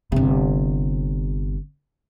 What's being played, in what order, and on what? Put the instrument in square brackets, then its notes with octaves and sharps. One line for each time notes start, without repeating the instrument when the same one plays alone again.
[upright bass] G1 C3